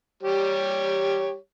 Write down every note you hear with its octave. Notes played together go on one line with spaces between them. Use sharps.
G3 G4 C#5